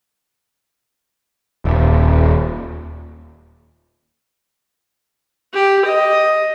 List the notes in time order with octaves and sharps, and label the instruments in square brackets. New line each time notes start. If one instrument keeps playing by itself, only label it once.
[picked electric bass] D#1
[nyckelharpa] G4
D#5